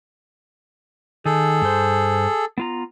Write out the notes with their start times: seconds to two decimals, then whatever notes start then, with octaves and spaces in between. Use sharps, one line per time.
1.25 D#3 G#4 A4
1.62 G2 C5
2.58 B3 F4 A#5